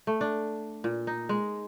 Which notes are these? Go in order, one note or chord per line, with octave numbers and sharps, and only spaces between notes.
A3
D4
A#2
D#4
G#3